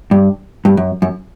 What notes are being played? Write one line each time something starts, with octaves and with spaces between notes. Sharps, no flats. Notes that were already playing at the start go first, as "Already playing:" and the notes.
G2
G2
F#2
F#2